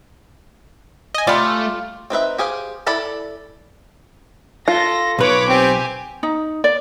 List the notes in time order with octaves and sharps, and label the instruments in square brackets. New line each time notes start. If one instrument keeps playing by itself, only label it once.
[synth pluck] D#5 G#5
[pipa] G3 D5 [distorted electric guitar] A3 [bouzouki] F4
[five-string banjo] C4 D#4 B4 E5
G4 G#4 C5 F5
E4 A4 D5 A5 B5
[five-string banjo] F4 [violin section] A4 A#6
[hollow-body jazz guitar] B1 B4 [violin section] C#5 B5 D6
[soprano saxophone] C4 [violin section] G4 G#5
[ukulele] D#4
D5